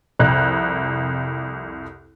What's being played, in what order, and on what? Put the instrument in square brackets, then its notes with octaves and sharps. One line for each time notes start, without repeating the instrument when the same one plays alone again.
[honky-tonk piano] C2 F2 F#6